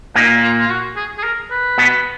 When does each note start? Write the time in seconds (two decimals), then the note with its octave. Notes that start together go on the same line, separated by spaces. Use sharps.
0.15 A#2 A#3 D#4
0.42 F4
0.60 F4
0.70 F#4
0.96 G#4
1.18 G#4
1.24 A#4
1.51 B4
1.78 B2 B3